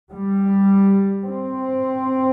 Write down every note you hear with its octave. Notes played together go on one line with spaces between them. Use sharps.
G3
C4